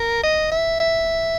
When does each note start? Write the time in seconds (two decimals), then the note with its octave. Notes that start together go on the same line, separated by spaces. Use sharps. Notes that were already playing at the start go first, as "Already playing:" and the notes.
Already playing: A#4
0.23 D#5
0.52 E5
0.80 E5